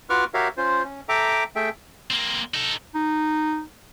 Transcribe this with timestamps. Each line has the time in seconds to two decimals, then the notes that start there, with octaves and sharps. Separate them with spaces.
0.10 F4 F#4 B4 C#6 D6 F6
0.34 F#4 G4 A#4 C#5 E5 F5
0.57 C#4 F4 C5
0.84 C#4
1.09 A4 E5 G5 A#5 D6
1.56 A3 G#4 A4 E5 G5
2.11 A#3 C4
2.54 D#4 A4
2.95 D#4